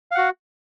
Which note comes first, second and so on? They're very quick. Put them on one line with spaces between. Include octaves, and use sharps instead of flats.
F5 F#5 F#4